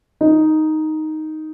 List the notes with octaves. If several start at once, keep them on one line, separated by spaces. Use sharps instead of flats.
D#4